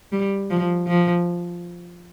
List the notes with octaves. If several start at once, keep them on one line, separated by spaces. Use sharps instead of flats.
G3
F3
F3